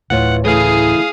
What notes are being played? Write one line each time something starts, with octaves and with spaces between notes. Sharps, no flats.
D1 A2 E3 F4 C#5 F#5
C#3 E3 A3 G#4 F5 D#6